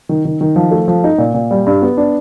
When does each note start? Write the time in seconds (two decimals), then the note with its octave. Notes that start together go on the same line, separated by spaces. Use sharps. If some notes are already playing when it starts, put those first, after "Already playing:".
0.09 D#3
0.25 D#3
0.41 D#3
0.56 F3
0.71 A3
0.88 F3
1.04 D#4
1.18 A#2
1.34 A#2
1.51 G3
1.66 G2
1.82 B3
1.97 D4